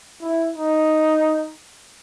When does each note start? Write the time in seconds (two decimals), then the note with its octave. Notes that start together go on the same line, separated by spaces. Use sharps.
0.21 E4
0.54 D#4